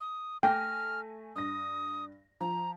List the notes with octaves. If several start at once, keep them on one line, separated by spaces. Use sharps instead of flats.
D#6
A3 G5 G#5 F6 A#6
G2 D#6 A#6
F3 A#5